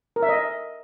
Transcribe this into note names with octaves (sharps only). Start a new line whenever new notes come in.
A#4
E5
D#5